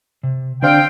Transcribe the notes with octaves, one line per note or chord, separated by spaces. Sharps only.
C3
D3 C4 D4 D5 F5 G5